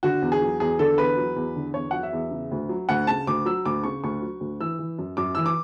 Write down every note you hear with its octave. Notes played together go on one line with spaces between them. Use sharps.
D3 F#4
E2
G#4
F#3
E2 G#4
D3 A4
E2 B4
F#3
E2
D3
E2 C#5
F#3 F#5
E5
E2
C#3
D2
F#3
D2 F#5
C#3 A5
D2 D6
F#3 E6
D2 D6
C#3 C#6
D2 C#6
F#3
D2
E3 E6
E3
F#2
F#2 D6
E3 E6
D6